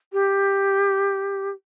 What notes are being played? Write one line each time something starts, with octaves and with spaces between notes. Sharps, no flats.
G4